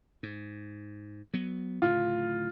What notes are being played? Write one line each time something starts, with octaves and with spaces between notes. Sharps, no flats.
G#2
F#3 B3
D1 A2 C#3 F4